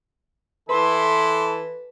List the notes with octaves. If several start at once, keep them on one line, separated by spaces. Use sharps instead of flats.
E3 E4 A4 B4 A5 C6